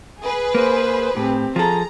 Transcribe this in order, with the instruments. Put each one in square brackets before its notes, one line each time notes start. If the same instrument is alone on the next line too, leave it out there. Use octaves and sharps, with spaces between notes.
[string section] G#4 B4
[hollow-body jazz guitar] A#3 [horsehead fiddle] C5
[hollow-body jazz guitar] A2 [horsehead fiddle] C4 G4
[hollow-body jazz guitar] F3 A4 [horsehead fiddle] G#4 [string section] A#5